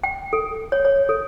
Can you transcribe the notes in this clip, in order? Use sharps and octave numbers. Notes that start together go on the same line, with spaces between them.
G5
A4
C#5
C#5
A4